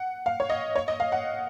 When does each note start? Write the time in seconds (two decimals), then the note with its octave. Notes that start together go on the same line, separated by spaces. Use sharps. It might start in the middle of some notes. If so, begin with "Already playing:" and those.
Already playing: F#5
0.26 F5
0.40 C#5
0.50 D#5
0.76 C#5
0.88 D#5
1.00 F5
1.12 F#5